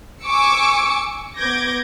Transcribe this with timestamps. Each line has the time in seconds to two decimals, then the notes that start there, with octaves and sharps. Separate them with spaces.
0.23 G#5 C#6 D6 E6 C#7
1.36 B3 D6 G6 G#6 A#6